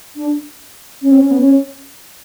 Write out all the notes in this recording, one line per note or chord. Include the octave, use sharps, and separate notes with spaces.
D4
C#4
C4
C#4
B3
C#4